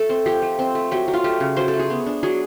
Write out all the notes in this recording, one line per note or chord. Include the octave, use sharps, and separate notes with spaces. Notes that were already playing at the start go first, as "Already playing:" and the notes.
Already playing: A3 A4
C4
F3 G4
A3
C4
A3
F#3 G4
F#3
F4
A3 G4
C#3
F#3 C5
A4
A3
G#4
B3
D4
F#3 G#4